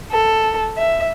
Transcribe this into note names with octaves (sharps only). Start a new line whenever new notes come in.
A4
E5